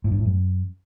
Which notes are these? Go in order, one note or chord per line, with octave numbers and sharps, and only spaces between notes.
A2
G2
A2
F#2